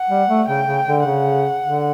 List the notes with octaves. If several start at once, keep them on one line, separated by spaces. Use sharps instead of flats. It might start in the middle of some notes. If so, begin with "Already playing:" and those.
Already playing: F#5
G3
A3
C#3 G5
C#3
D3
C#3 F#5
D3